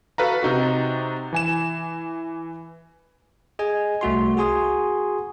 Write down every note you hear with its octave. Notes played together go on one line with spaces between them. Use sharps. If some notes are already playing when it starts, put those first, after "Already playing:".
F#4 A4 B4 F5 A#5
C3 D#4 F#4
E3 G#5 E7
G#4 D#5 G#5
C2 A3 F#4 C6
F#4 G#4 G#5 C6 D#6